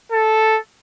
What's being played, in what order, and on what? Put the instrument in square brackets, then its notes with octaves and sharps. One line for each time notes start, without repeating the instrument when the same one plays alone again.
[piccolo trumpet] A4